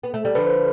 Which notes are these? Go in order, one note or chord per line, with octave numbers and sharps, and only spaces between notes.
B3
A3
G3
D3 F3 B4